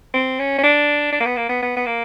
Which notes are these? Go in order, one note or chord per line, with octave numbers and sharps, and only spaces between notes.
C4
C#4
C#4
D4
D4
A#3
B3
A#3
B3
B3
B3
A#3